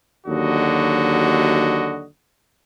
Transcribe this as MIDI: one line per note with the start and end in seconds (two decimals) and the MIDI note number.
0.26 2.05 39
0.26 2.05 50
0.26 2.05 54
0.26 2.05 66
0.26 2.05 75